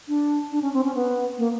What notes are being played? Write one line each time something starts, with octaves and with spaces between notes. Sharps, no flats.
D4
D4
C#4
C4
C#4
B3
A#3